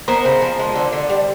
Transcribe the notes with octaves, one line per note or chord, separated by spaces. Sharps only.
B3 A#4 C5
C#3
F3
G#3
D3
D3
G3